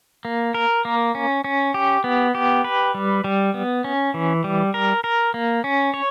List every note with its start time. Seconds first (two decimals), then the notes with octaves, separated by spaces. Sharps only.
0.25 A#3
0.54 A#4
0.85 A#3
1.15 C#4
1.44 C#4
1.74 G4
2.04 B3
2.35 G4
2.64 B4
2.94 G3
3.24 G3
3.54 B3
3.84 C#4
4.14 E3
4.44 G3
4.74 A#4
5.04 A#4
5.34 A#3
5.64 C#4
5.94 C#5